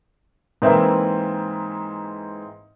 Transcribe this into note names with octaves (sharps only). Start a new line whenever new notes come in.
G#2 E3 A#3 C4 E4 E5